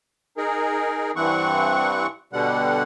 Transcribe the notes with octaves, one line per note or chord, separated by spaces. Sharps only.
D#4 G#4 A#4
G2 E3 C4 F#5 C#6
B2 D3 G3 F#5